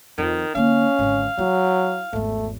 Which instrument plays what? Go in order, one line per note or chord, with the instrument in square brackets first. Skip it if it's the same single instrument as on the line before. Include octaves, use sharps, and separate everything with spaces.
[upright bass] F2 [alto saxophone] D#3
[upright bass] D3 A#3 [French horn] C#4 [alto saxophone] F5
[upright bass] G#1 D3
[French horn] F#3 [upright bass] E4
[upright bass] G#1 E2 [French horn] A3